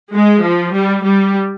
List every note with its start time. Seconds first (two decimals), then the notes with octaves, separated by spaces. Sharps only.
0.14 G#3
0.43 F3
0.74 G3
1.05 G3